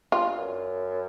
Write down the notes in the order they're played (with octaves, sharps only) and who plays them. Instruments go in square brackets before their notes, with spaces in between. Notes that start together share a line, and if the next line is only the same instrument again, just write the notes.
[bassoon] G2 [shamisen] F4
[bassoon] F#2